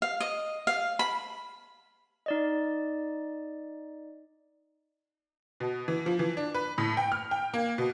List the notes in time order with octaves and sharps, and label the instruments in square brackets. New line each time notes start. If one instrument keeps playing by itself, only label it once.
[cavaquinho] F5
D#5
F5
B5
[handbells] D#4 D5 D#5
[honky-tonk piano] B2
E3
F3
E3
D4
B4
A2
G5
F6
G5
A#3
B2